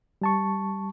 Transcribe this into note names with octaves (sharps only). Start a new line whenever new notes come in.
G3 A5 C#6